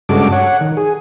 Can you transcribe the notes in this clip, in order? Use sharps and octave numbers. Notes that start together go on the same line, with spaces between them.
G2 C#3 G#3 F#4 A4 D6
C#5 F#5
D#3
G#4